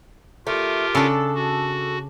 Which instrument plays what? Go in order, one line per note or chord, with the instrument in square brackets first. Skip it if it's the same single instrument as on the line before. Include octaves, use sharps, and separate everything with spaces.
[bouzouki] A3 [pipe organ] F4 G4 A#4
[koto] C#3 D4 [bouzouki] A4
[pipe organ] F#4